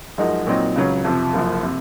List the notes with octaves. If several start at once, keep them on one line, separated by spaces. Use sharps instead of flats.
F#2 F3 G#3 D#4 F#4
A#2 F#3 C4 D#4
C#2 C#3 F#3 C#4
F2 C3 F3
F#1 F#2 F3
C3